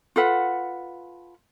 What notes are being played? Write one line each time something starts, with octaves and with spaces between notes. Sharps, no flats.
F4 A4 B4 F#5